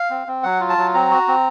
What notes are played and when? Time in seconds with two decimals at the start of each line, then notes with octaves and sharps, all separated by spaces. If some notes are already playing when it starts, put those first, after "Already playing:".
Already playing: F5
0.10 C4
0.27 C4
0.43 F#3 F#5
0.60 F4
0.69 A5
0.78 F#3
0.94 C4 A#5
1.11 F#4
1.28 C4